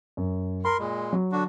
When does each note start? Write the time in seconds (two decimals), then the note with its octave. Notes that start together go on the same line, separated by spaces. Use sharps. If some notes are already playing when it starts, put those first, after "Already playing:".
0.17 F#2
0.65 A#4 B5 C6
0.79 A#2 G#3
1.13 F#3
1.32 D3 D4 F#4